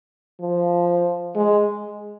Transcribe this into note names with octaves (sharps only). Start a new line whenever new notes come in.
F3
G#3